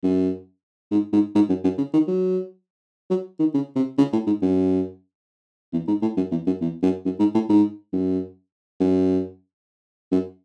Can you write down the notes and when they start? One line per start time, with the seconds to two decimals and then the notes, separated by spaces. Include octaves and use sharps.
0.04 F#2
0.91 G#2
1.13 G#2
1.35 G#2
1.49 F#2
1.64 F#2
1.78 C#3
1.93 D#3
2.08 F#3
3.10 F#3
3.40 D#3
3.54 C#3
3.76 C3
3.98 C#3
4.13 A2
4.27 G#2
4.42 F#2
5.73 E2
5.88 G#2
6.02 A2
6.17 F#2
6.32 E2
6.47 F#2
6.61 E2
6.83 F#2
7.05 F#2
7.19 G#2
7.34 A2
7.49 G#2
7.93 F#2
8.80 F#2
10.12 F#2